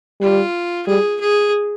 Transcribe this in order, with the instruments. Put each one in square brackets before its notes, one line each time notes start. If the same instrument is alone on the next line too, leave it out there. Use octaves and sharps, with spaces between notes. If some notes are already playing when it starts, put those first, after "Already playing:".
[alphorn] G3 [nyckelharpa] F4
[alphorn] G3 [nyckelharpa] G#4
[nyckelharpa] G#4